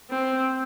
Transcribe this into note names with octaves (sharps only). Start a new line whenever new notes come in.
C4